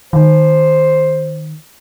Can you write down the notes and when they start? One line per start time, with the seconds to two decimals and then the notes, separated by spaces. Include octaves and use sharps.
0.13 D#3 C5